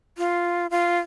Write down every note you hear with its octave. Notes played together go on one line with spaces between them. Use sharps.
F4
F4